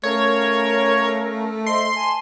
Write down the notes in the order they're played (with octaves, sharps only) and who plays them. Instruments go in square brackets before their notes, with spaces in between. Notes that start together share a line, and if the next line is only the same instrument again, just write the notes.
[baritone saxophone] A3 [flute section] C#4 A#4 F5 [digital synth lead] C#5
[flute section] C5 D#5 E5 [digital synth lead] C6
[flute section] G#5 A5